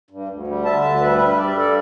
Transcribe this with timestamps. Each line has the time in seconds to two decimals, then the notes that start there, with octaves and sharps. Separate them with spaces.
0.11 G2
0.29 D2
0.47 G3
0.65 D3 E5 A5
0.84 D2
1.01 G3 B4 E5
1.19 G2
1.37 G3 D5
1.47 E5
1.56 G2 A4 D5